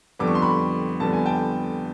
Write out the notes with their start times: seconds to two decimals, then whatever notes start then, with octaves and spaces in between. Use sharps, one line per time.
0.19 F2 D3 G3 B3 D6
0.27 C#6
0.35 C6
0.42 B5 C#6
1.00 F2 D3 G3 B3 A5
1.13 G#5
1.25 G5 A5